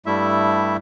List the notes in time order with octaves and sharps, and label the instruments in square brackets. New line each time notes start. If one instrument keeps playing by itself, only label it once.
[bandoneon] G2 G3 A3 E4 E5